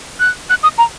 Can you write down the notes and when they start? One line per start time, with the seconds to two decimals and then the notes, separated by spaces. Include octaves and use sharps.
0.20 F#6
0.50 F#6
0.63 D#6
0.78 A#5